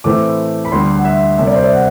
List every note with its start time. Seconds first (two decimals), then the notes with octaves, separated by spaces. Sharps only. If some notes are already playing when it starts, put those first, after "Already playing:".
0.04 A2 E3 A3 C4 D6
0.65 B5
0.72 D2 D3 G3 C6
0.95 F#5
1.05 E5
1.38 C2 C3 G3 E5
1.47 D5
1.55 C5
1.63 D5
1.73 F#5